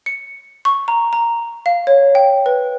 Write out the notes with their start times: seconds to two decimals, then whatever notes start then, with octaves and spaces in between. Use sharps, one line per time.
0.06 C#7
0.65 C#6
0.88 A#5
1.13 A#5
1.66 F5
1.87 C#5
2.15 G5
2.46 B4